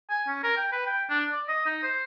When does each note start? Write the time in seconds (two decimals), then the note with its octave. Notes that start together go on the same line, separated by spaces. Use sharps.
0.10 G#5
0.28 C#4
0.43 A#4
0.57 G5
0.72 B4
0.86 G5
1.09 D4
1.32 D5
1.48 D#5
1.66 D#4
1.83 C5